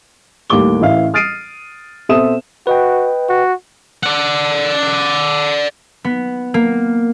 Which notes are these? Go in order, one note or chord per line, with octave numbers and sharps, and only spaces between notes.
D#2 A2 G3 D6 G7
A1 E3 E5 F5
D#6 F6 A6 C7 D7 D#7
B2 C4 A4 E5 D#6 E7
F#4 B4 D#5 G5
F#4
D5 F#5
B3
A#3